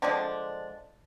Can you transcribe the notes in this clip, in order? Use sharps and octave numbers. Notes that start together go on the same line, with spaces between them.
D3 F3 G#3 D4